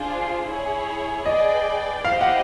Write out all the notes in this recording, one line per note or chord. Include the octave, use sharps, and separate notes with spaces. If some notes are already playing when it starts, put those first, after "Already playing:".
Already playing: D4 F4 G#4 C5
E4 G#4 C#5
G#4 B4 D5 D#5 G5
E4 G4 C5 D#5 F5 G5
F#5